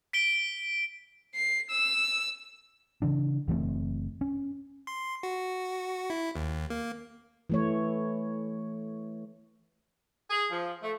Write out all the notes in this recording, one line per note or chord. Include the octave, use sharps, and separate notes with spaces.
B6 D7 G7
C7
E6
C#3 E3 D4
F#1 E3 A3 C4
C#4
C6
F#4
E4
D#2
A#3
E3 A3 C#5
G#4
F3
A3